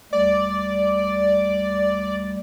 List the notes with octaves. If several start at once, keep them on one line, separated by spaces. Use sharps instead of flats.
D2 G3 D5